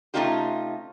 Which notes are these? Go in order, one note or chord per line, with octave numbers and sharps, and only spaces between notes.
C3 A3 C#4 D#4 F4 G4